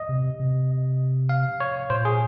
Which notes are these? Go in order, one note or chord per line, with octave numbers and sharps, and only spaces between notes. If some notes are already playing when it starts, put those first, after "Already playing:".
Already playing: D#5
C3
C3
F5
C#5
A#2 C5
G#4